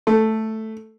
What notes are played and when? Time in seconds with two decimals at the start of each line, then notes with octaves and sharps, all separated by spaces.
0.07 A3